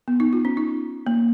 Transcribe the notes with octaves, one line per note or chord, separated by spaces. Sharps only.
B3
D#4
F4
C#4
D#4
A#3